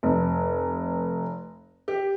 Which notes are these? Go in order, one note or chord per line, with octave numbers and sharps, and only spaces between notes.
F1
G4